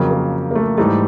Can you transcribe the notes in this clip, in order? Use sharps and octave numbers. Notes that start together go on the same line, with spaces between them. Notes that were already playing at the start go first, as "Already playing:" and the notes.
Already playing: F2 C#3 F#3 A#3
A#3
A#3
A3
G#2 E3 G3 A3